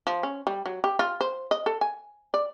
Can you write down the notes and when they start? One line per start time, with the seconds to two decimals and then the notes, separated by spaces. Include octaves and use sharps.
0.07 F3
0.23 C#4
0.47 G3
0.66 F#3
0.84 G4
0.99 F4
1.21 C5
1.51 D#5
1.66 A4
1.81 G#5
2.34 D5